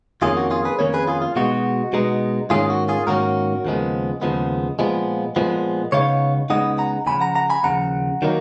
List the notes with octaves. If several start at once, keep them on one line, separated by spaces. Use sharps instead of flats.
F2 D#3 A#3 C#4 F4 G#4
F#4
F4 G#4
G#4 B4
F2 D#3 A#3 C#4 A#4 C#5
G#4 B4
F4 G#4
F4
B2 G#3 B3 D#4 F#4
B2 G#3 B3 D#4
G#2 D#3 A#3 C#4 F4 G#4
F#4
F4 G#4
G#2 D#3 A#3 C#4 F#4 A#4
D#2 C#3 F3 G#3 B3
D#2 C#3 F3 G#3 B3
A#2 F3 G#3 B3
A#2 F3 G#3 B3
C#2 C#3 G#3 B3 D#4 C#5 F5
C#2 C#3 G#3 B3 D#4 D#5 F#5
F#5 A#5
D#2 C#3 F3 G#5 B5
F#5 A#5
F#5 A#5
G#5 B5
D#2 C#3 F3 F#5 A#5
D#3 F#3 A#3 D#4